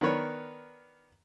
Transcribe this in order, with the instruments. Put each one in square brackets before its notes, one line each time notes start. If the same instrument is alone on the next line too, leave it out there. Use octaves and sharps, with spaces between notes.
[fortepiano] D#3 B3 D4 A#4 B4 C#5